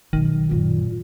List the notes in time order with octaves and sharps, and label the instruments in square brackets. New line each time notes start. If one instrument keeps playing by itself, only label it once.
[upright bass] B1 [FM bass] D#3
[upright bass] F#2 [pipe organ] A#2